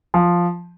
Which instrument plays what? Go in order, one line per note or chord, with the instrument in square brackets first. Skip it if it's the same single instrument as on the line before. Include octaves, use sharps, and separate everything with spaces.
[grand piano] F3